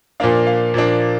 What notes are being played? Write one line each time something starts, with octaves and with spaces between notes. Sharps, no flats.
A#2 F3 A#3 D4 F5
F5
A#2 F3 A#3 D4